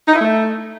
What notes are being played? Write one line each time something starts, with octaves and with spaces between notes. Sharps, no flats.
D#4
E4
A3